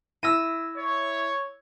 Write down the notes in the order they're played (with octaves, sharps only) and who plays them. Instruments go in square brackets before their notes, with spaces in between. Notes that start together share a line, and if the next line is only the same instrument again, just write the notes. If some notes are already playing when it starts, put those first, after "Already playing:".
[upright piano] E4 [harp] E6 A#6 D#7
[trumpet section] C#5